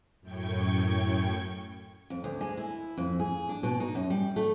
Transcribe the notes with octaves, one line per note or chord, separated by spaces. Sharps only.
F#2 A2 G5 C#6 G#6
F2
D2
G#3
E4
F2
G#4
D4
B2
D#4
F#2
G3
A3